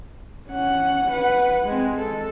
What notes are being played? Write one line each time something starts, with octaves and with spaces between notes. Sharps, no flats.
C#4 F#5
B4 F#5
G#3 C4
A4